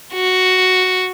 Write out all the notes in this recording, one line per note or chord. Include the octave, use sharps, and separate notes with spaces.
F#4